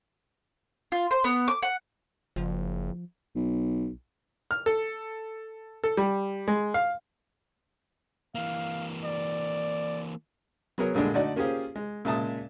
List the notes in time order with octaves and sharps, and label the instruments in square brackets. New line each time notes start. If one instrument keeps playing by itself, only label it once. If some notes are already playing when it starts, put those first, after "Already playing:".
[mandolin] F4
C5
B3
D6
F#5
[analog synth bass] F#1 [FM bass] F3
[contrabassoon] B1
[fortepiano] F6
A4
A4
G3
G#3
F5
[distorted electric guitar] E3 A#3 [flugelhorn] F5
[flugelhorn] D5
[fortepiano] F#3 B3 G#4 A#4 C#5
A#2 D3 G3 G#3 D4
D3 A3 D#4 F#4 D5
A#3 C#4 F4 G4 G#4 C5
G#3
A#2 C#3 G#3 E5 A5 D#6